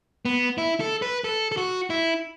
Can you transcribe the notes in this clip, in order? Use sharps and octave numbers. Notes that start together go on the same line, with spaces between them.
B3
E4
A4
B4
A4
A4
F#4
E4